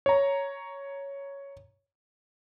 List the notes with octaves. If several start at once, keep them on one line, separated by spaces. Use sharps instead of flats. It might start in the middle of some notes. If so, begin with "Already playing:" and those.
C#5 A#5